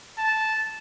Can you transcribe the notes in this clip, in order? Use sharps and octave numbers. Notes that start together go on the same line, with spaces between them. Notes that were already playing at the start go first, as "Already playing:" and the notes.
A5